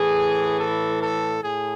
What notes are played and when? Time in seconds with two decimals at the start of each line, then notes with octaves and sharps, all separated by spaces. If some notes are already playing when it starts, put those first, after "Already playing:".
Already playing: A2 E3 G#4
0.60 A4
1.02 A4
1.42 A2 G#4